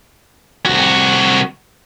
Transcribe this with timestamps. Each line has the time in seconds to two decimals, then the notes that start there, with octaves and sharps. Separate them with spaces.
0.66 C2 F#4